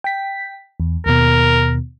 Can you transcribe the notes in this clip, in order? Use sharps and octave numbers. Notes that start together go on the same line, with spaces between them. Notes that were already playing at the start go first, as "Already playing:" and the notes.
G5 B6
E2
D#2 B2 A#4